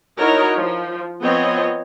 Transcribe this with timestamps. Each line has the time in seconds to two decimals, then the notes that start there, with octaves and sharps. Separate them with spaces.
0.19 D#4 E4 F#4 A#4 C#5 D#5
0.56 F3
1.23 F3 B3 C4 C#5 D#5